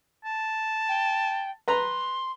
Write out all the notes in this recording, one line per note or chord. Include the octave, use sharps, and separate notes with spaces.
A5
G5
B4 A#5 C6